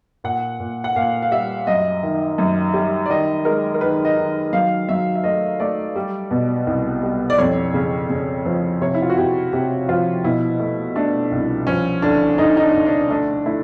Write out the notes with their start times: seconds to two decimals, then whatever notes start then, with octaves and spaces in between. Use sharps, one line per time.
0.24 A#2 F#5
0.60 A#2
0.84 F#5
0.96 A#2 F5
1.22 F5
1.31 G3 E5
1.67 F#2 D#5
2.03 D#3
2.38 F#2
2.74 G3
3.06 D5
3.10 D#3 D#5
3.45 G#3 A#4
3.74 A#4
3.81 D#3 B4
4.05 D#5
4.16 D#3
4.53 F#3 F5
4.89 F#3 E5
5.16 E5
5.24 A3 D#5
5.60 A3 D5
5.96 G3
6.31 B2
6.67 C2
7.03 G3
7.30 D5
7.38 F2 C#5
7.74 C#3
8.10 C#3
8.46 F3
8.81 C3 C#5
8.94 E4
9.02 F4
9.09 F#4
9.17 C3 G4
9.53 C3 G4
9.89 F3 F4
10.24 B2 E4
10.60 A3
10.96 A3 D4
11.32 C2
11.67 F3 C#4
12.02 D2 D4
12.38 D2 D#4
12.57 D#4
12.63 D4
12.75 D2
12.86 D4
13.10 A3 D4
13.46 A3 E4